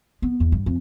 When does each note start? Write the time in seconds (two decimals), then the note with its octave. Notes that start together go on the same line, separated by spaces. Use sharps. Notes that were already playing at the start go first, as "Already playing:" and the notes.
0.22 B3
0.40 E2
0.52 G2
0.66 F2